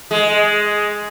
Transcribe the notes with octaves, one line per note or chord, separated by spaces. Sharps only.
G#3